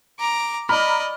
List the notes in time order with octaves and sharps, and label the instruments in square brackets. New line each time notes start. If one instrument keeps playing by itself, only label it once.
[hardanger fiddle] A#5 D6
[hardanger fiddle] D5 D#5 [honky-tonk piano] A#5 B5 F6